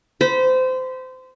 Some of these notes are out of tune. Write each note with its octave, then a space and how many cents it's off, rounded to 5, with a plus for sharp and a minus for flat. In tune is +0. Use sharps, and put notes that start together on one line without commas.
C5 -25 B5 -15